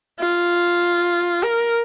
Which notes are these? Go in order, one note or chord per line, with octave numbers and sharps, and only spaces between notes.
F4
A#4